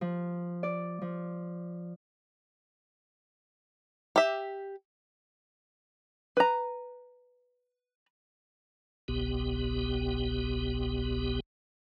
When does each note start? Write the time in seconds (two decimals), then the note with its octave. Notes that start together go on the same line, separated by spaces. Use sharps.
0.01 F3
0.63 D5
1.02 F3
4.16 G4 E5
6.37 B4 A#5
9.08 G1 C2 B2 B3 G4